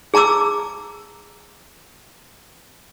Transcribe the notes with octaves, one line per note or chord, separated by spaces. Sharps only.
G#4 A5 A#5 D6 E6